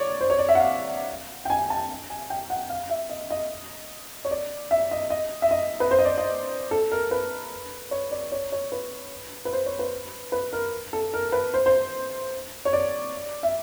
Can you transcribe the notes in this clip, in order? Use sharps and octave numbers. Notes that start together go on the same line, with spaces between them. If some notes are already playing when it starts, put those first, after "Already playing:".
Already playing: C#5 D5
C5
C#5
D5
E5
F#5
F5
G5
G#5
A5
G#5
G5
F#5
F5
E5
D#5
D#5
C#5
D5
E5
D#5
D#5
E5
D#5
B4
C5
D#5
D5
D#5
A4
A#4
B4
C#5
D5
C#5
C#5
B4
B4
C5
C#5
B4
B4
A#4
A4
A#4
B4
C5
C5
C#5
D5
E5